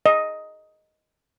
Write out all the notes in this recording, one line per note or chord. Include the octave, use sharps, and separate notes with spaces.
D#5